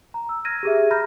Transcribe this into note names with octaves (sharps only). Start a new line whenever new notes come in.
A#5
E6
F6 G#6 A#6 D#7
G4 G#4 E5
A#5 B5 F6 G6 A#6